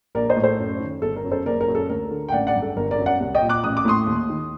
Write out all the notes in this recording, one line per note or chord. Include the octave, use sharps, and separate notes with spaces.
A#1 A#4 D5
C5 D#5
A2
A4 C5
F#2
D#3
G1 A4
A#4
F#2
A4 C5
F#1 A#4 D5
A#4
F#2
A4
D2 A#4
D3
G5
A1 D5 F#5
D5 F#5
G2
A4
G1 A#4
A#4 D5
F#2
D5 F#5
C2
D#5 G5
A#2
D6 F#6
A1 D#6
D6
A2 C6 D#6
D#2
D#3